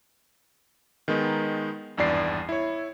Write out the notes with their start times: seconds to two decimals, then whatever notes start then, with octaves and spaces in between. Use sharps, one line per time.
1.08 D#3 G#3 B3 D#4
1.97 G#1 E2 G2 D5 C7
2.49 E4 C#5